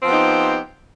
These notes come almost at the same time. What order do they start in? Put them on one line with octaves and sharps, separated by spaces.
C4 F3 B3 G4 D#4